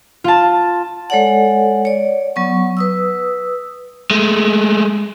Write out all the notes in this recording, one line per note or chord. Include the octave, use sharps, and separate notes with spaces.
F4 A5
G#3 A4 C#5 D5 F#5
C#5 D5
F#3 B3 C#6
B4 D#6 E6
G#3 A3